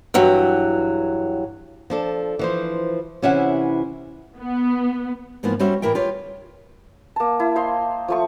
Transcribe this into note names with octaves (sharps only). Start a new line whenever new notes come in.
G2 E3 F#3
F3 D4 A4
E3 F3 C5
C3 E3 C#4 E4 E5 F#5
B3
G#2 E3 F3 A#3 B3
G3 C#4 F#4 C5 E5
A2 E3 E4 A#4 E5 G5
F4 G4 B4 C#5
A#3 A5
E4
C5 D#5 F5 C6
F3 A3 C#6